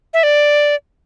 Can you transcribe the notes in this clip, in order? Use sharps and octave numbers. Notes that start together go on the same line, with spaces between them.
E5
D5